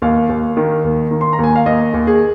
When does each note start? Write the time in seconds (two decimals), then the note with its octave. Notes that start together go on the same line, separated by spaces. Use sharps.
0.02 D#2 F5
0.29 D#2
0.57 D#3
0.84 D#2
1.11 D#3
1.21 C6
1.33 A#5
1.39 D#2
1.44 G#5
1.56 F5
1.66 D#2 D#5
1.94 D#2
2.07 G#4